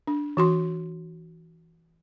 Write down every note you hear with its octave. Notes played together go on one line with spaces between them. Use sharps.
D4
E3 F#4 C6